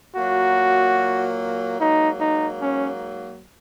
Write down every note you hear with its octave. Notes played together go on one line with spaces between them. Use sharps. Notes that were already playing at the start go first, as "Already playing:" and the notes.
A#2 F#3 A#3 F#4
G#2 F#3 A#3 D#4
D#4
C#4